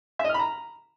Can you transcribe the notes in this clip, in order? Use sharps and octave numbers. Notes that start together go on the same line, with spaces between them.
E5
D#5
F6
B5
A#5